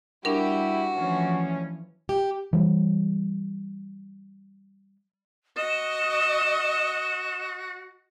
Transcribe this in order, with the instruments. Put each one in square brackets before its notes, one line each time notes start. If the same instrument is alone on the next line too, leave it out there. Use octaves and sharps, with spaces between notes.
[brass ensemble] G3 E4 [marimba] D4 A#4 [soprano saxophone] F#4 [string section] G4
[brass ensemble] D2 C#4 [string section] E3 F3
[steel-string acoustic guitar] G4
[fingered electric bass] E3 G3
[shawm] F#4 [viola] D#5 [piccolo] E7